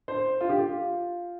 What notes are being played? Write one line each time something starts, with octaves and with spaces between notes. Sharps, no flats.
C5
F4
G4
F4